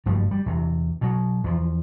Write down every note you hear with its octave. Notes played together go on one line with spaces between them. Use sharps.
F#1 G2 F3 A3
G3
E2 C3
B2 F#3
E2 F3